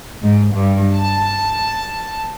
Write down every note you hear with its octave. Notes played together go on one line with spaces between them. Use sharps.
G#2
G2
A5